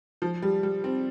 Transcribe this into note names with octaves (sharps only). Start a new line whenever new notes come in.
F3
G3
G3
C4